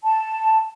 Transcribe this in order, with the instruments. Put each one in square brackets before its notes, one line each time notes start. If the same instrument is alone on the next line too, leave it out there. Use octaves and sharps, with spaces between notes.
[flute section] A5